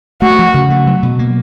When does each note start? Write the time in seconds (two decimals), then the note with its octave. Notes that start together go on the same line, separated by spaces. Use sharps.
0.22 A3 F#4
0.39 F3
0.54 C#3
0.70 A3
0.87 F#3
1.03 B2
1.19 A#3